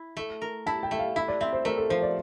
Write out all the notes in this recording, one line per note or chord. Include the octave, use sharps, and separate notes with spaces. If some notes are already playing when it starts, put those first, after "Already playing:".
Already playing: E4
A3
A#4
E4 A5
G5
A3 E5
F5
E4 E5
D5
C4 E5
C5
A3 A#4
A4
F3 C5
D5